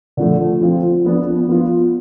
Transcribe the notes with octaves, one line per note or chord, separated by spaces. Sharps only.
D3 F3 A3
F3 C4 F4
F3 B3 D4
F3 B3 F4